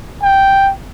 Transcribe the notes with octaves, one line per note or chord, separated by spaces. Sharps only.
G5